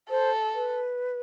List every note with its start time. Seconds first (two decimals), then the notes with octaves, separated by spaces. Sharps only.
0.10 A4 C5
0.55 B4